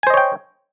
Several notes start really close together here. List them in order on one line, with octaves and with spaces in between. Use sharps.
G#5 C5 D#5 C#5 G5